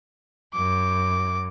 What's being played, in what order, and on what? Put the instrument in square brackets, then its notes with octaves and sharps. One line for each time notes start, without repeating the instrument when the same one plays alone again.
[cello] F#2 [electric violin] D6